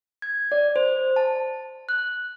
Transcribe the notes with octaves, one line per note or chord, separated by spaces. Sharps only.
G#6
D5
C5
A5
F#6